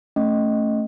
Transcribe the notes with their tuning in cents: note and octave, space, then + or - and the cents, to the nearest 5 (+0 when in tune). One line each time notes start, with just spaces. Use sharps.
A3 +10 C#4 +0 D#5 +0